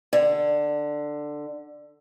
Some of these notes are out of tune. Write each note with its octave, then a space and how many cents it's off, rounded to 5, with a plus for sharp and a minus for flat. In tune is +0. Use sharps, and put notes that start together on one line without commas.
D3 +10